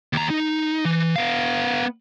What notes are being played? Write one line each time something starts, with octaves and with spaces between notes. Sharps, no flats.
D#2 A#5
D#4
E3
B3 F5